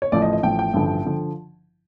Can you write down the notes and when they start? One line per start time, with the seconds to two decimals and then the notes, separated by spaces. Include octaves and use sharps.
0.02 C#5
0.12 A1 A2 F3 D5
0.22 D#5
0.33 D#5
0.43 A1 A2 F3 G5
0.59 G5
0.74 A1 G2 D3 F3
1.05 D3 F3